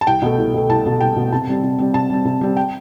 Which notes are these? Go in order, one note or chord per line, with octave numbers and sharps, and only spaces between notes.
A5
C2 G5
B2 A3
C2
B2 A3
C2 A5
B2 A3
C2 G5
B2 A3
C3 A5
G3 C4
C3
G3 C4
C3 A5
G3 C4
C3
G3 C4
G5